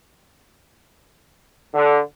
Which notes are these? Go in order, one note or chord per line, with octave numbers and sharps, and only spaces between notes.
D3